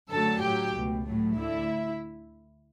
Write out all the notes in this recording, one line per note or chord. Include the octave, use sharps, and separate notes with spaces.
F#2 D3 F#3 A3 A4 A5
A2 F#3 A3 G4 G5
C#2 B2 A3
A2 F#3 A3
D2 D3 A3 E4 E5